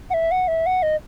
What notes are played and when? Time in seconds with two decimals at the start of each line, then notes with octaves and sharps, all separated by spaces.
0.10 F#5
0.14 E5
0.31 F#5
0.48 E5
0.66 F#5
0.83 D#5